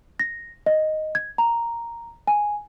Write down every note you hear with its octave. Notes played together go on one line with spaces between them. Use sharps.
A#6
D#5
G#6
A#5
G#5